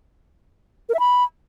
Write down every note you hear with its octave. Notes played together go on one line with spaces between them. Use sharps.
A#4
E5
B5